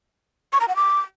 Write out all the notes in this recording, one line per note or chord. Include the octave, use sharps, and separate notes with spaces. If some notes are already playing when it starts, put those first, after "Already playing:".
C#6
A#5
F#5
D6